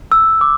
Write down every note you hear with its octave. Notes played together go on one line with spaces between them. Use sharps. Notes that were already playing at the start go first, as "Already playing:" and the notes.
E6
D6